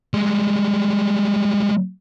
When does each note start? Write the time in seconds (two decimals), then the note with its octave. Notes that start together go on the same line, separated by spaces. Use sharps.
0.14 G3 G#3